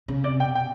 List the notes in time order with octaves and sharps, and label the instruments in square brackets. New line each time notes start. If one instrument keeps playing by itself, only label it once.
[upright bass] C#3
[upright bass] C3 [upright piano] D5
[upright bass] B2 [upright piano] G5
[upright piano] G5